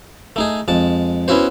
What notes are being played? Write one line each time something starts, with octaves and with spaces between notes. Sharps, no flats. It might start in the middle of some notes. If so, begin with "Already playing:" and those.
A3 D#4 G#4
F2 G#3 A5
B3 C#4 E4 F#4 C5